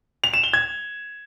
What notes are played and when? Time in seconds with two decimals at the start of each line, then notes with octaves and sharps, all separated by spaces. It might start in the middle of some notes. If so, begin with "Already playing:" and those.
0.24 F7
0.34 E7
0.44 G7
0.53 G#6